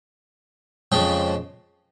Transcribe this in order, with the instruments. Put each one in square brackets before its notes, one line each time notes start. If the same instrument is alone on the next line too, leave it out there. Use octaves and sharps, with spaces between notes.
[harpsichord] F2 C#3 F3 G#3 G5